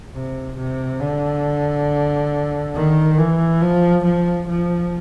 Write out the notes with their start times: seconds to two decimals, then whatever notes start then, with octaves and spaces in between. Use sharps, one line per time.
0.14 C3
0.57 C3
1.00 D3
2.75 D#3
3.18 E3
3.61 F3
4.05 F3
4.48 F3